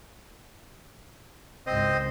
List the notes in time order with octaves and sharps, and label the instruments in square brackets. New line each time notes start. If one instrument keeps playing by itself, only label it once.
[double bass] G#1 C#2 [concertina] C4 C5 D#5